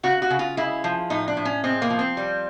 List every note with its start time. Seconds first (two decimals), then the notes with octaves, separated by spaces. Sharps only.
0.03 C#3 F#4
0.22 F#4
0.30 C#3
0.39 F4
0.57 G#3 E4
0.84 F3
1.10 A2 D#4
1.28 D4
1.37 A2
1.45 C#4
1.64 G#3 C4
1.82 A#3
1.90 F3
1.99 C4
2.17 G3